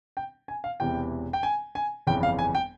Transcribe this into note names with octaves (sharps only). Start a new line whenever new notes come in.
G5
G#5
F5
E1 E2 C3 E3 G5
G5
G#5
G#5
G1 F2 C#3 E3 G5
F5
G#5
G5